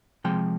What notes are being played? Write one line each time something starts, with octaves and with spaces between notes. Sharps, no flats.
C3 F3 G#3 G5